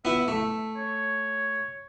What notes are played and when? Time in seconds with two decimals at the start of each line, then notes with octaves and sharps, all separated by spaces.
0.05 B3 E4 E5
0.28 A3
0.76 C#5